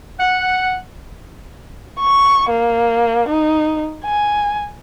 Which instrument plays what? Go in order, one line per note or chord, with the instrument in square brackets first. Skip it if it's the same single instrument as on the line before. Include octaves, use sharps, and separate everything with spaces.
[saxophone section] F#5
[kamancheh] C#6
A#3
D#4
G#5